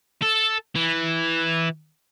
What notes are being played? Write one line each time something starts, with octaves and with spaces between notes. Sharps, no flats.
A4
E3